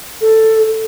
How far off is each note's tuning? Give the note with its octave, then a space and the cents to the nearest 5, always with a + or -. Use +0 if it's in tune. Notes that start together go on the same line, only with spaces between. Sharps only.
A4 +10